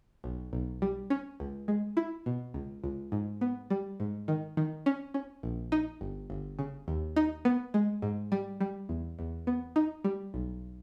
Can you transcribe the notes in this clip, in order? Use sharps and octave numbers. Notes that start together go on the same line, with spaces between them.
B1
B1
G3
C#4
C#2
G#3
E4
B2
C#2
C#2
G#2
B3
G3
G#2
D#3
D#3
C#4
C#4
A#1
D#4
G1
G1
C#3
D#2
D#4
B3
G#3
G#2
G3
G3
E2
E2
B3
D#4
G3
B1